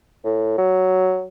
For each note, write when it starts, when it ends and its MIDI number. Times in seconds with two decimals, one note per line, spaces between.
0.24 0.54 45
0.58 1.25 54